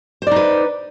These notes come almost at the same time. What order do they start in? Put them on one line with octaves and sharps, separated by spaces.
C5 D5 D#4 B4